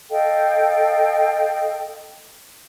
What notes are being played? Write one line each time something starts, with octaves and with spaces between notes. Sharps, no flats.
A4 D#5 F5 G5